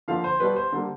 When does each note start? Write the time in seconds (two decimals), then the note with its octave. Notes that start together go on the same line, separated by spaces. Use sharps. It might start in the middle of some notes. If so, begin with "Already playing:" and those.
0.08 D3 F3 A#3 F5
0.24 C5
0.40 B2 G3 B3 B4
0.56 C5
0.72 D3 G3 A#3